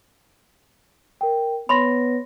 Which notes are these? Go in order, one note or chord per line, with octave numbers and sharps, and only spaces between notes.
A#4 G5
B3 C#5 B5 C6 A#6